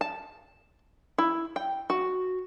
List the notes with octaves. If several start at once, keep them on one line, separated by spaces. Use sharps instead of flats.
A5
E4
G5
F#4